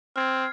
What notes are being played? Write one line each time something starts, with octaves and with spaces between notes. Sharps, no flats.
C4 F6 G#6 C7